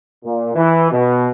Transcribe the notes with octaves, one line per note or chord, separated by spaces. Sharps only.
A#2
E3
B2